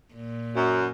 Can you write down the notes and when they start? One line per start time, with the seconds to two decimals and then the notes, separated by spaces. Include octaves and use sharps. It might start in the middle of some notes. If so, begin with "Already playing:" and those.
0.14 A#2
0.56 F#2